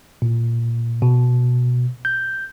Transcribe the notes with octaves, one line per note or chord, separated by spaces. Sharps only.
A#2
B2
G6